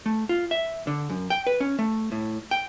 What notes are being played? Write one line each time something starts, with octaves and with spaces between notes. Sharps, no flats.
A3
F4
E5
D3
F#2
G5
B4
C#4
A3
A2
G5